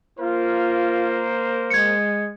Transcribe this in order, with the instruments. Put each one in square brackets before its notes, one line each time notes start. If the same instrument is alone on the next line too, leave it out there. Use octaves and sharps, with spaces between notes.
[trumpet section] A#3 A#4 C5 [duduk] F4
[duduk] G#3 [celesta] G#6 C#7